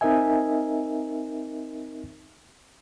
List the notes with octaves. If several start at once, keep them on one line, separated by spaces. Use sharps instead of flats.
C4 D#4 A#4 D#5 E5 G#5